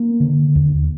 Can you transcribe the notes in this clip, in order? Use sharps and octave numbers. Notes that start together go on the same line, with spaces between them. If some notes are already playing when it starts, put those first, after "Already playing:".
Already playing: A#3
D3
D#2